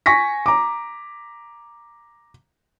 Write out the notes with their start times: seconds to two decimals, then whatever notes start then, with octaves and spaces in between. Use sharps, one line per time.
0.06 G#5 C#6 A#6 B6
0.46 A#5 D6